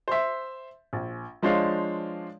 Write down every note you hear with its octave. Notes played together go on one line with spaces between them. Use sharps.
C5 E5
A#1
F3 G#3 D4 C5 C#5 F5